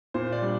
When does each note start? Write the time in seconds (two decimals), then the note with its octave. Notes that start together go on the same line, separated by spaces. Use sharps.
0.14 A#2 C5
0.32 D5
0.42 G3 D4